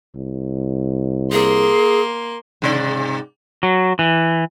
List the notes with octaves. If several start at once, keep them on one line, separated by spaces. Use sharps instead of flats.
C2
A#3 G#4 C6
G#2 C3 D5
F#3
E3